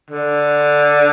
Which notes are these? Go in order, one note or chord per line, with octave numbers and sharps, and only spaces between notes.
D3